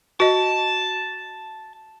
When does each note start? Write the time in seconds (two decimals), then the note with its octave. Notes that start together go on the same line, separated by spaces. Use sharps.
0.20 F#4 D#5 A5